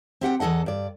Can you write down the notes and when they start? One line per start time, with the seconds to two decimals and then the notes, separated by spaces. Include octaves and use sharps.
0.21 C4 G4 F#5 G5
0.40 E2 E3 A4 D#5 F#5
0.66 G2 D5